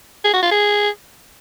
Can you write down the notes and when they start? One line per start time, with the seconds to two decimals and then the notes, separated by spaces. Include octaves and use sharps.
0.25 G#4
0.34 F#4
0.42 F4
0.51 G#4